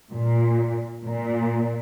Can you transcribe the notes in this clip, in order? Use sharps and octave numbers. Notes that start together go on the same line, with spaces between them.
A#2
A#2